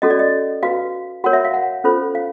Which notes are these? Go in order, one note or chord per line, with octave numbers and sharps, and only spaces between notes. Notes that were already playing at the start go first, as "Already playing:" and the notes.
C#4 F#4 A4 D#5
D5
D#5
F#4 B4 F5
F#4 A#4 C#5 F#5
E5
F5
F#5
C#4 F4 A4 C5
F5